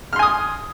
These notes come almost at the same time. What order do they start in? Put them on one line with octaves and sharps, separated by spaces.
F6 C6 G#5 D#6